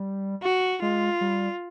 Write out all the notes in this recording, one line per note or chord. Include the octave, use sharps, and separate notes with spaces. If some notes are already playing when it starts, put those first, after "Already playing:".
Already playing: G3
F#4
G#3 F4
G3